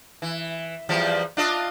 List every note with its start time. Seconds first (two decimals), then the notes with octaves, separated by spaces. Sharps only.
0.22 E3
0.89 E2 F3 G3
1.37 D4 F4 D#5